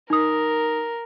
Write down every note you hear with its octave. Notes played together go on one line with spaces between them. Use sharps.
D#4 A#4 D#6